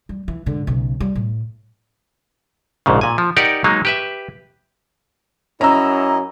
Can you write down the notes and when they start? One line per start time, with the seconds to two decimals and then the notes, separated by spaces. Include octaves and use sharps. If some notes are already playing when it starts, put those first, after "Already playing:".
0.09 G3
0.28 E3
0.46 G#2 D3
0.67 B1 C#3
1.00 G3
1.15 A2
2.86 A#1 G#2 C#3
3.01 A#2 G#5
3.18 F3
3.37 D#4 G4 A#4 D5 F#5
3.64 F#3 G#3 A#3 D#4
3.85 G4 B4 E5
5.61 F#2 C#4 E4 D#5 A#5 E6